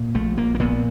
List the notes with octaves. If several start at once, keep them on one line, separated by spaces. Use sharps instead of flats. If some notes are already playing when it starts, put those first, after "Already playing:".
Already playing: A#2
A#1 A3
A#1 A#3
A#3
A#2 B3